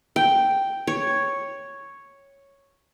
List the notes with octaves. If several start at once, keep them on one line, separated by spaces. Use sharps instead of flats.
G5
C#5